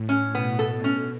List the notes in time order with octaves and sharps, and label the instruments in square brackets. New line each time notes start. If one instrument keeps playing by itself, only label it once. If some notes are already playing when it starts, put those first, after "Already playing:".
Already playing: [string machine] A2
[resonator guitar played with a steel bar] C#4
[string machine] B2 [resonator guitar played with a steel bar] B3
[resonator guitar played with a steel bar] A4
[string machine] B2 [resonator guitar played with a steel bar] C#4